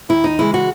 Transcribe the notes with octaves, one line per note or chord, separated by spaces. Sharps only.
D#2 E4
D#4
C#3 E3 G#3 E4
F#4